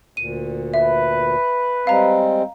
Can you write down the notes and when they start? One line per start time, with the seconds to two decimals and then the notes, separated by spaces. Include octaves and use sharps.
0.17 D2 A#2 D#7
0.74 B4 E5
1.87 G3 G#3 C4 F5 A#5